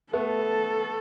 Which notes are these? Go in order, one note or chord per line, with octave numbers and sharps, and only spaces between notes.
A3 B3 A4